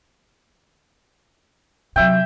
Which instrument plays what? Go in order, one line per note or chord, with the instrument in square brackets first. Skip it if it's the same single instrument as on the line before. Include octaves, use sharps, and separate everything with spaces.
[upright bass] C3 F#3 [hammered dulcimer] E5 G5